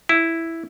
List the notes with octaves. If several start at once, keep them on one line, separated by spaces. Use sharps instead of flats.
E4